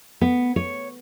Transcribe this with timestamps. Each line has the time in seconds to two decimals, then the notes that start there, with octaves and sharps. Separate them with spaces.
0.21 B3
0.56 C#5